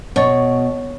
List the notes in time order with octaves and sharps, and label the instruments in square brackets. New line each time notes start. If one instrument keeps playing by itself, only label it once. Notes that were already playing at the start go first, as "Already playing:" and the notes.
[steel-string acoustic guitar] B2 [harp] C#5 A6